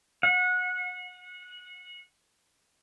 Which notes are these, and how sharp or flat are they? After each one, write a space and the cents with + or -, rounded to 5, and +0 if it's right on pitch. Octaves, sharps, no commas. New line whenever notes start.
F#5 -25